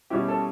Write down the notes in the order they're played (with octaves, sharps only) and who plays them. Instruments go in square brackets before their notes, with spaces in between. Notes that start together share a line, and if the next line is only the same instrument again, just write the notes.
[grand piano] B2 G3 C#4 E4 G4
A4